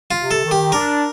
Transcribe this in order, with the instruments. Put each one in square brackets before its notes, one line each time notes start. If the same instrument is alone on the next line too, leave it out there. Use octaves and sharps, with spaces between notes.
[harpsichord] F4
[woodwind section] C3
[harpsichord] A4
[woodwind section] D#3
[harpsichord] G4
[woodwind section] D4 [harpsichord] A#4